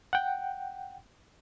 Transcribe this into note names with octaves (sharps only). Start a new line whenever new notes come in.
F#5 G5